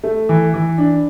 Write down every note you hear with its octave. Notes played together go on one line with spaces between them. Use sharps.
A3
E3
E3
D4